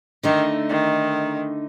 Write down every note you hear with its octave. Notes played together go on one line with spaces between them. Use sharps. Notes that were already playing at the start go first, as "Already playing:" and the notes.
D3 D#3 A3 D#4
D#3